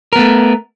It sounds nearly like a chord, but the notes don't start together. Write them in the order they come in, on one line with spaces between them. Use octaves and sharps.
A#4 B3 A3